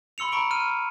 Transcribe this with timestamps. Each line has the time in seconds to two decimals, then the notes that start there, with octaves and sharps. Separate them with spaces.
0.18 B5 C6 E6 C#7 F7
0.32 A#5 B5 C#6 D7
0.51 F6 D#7